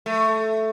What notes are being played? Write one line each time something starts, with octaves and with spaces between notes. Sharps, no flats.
A3